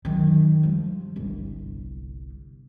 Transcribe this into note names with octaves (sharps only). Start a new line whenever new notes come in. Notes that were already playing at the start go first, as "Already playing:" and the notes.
F#2 D#3
F3 G3
G1 C2